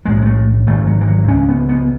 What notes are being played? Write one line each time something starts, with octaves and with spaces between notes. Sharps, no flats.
B1 A2 G#3
G#3
A3
G#1 G#2 A3
F#3
E3
F#3
C#2 C#3 C#4
B3
B3